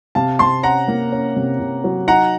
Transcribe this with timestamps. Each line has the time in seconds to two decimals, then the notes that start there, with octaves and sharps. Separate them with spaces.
0.15 C3 F5 A5
0.39 C3 A5 C6
0.63 C#4 F#5 A#5
0.88 A#3
1.12 C#4
1.36 C3
1.60 C3
1.84 F#3
2.07 D#4 F#5 A#5